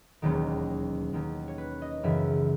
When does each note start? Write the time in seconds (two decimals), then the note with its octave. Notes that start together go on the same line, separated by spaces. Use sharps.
0.22 E1 D#2 D#3 F#3 C#4
1.13 D#2 D#3 F#3 C#4
1.48 C#5
1.58 B4
1.82 D#5
2.03 F#1 F#2 C#3 E3 E5